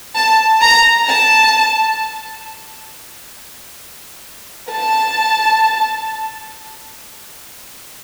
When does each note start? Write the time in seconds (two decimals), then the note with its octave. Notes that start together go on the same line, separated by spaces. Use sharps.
0.16 A5
0.62 A#5
1.07 A5
4.70 A5